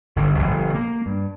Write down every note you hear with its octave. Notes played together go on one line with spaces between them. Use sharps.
G1 D3
G1 C#2 B2 F3
A#3
G2